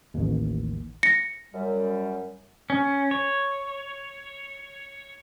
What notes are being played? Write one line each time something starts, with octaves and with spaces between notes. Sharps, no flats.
A1 D#2
A#6 C#7
F#2 G3
C#4
C#5